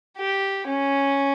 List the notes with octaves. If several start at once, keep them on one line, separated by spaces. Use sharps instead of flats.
G4
C#4